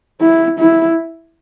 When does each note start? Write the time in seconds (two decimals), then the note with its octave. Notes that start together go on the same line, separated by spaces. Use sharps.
0.21 E4
0.59 E4